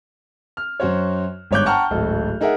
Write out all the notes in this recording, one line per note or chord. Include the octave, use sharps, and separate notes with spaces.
F6
F#2 F#4 C5 C#5
G1 G#2 C#5 D6 F#6 G6
F#5 G5 A5 A#5 C#6 F6
D1 G#1 A4 D#5
D#4 G#4 A#4 E5 F#5